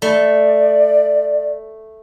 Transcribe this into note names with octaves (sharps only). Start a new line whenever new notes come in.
A3 D5